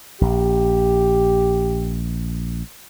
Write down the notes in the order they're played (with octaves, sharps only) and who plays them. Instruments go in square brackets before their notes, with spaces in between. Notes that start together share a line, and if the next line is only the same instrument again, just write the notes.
[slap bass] A#1 [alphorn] G4